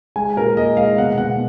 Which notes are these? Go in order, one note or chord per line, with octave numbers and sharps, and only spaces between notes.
G#3 G#5
A#2 A#4
G#3 D#5
G#3 F5
B2 F#5
B2 F#5